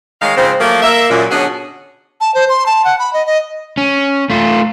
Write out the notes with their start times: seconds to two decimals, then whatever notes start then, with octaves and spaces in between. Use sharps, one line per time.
0.22 D#3 G#3 C#5 F5
0.36 G#2 C#3 F3 C4
0.60 F3 F#3 A3 A#3
0.83 A#3 E5
1.10 F#2 A#2
1.31 B2 D3 F#3 C#4 F#4 G#4
2.21 A5
2.35 C5
2.49 C6
2.66 A5
2.85 F#5
2.99 B5
3.13 D#5
3.26 D#5
3.78 C#4
4.30 A3 F4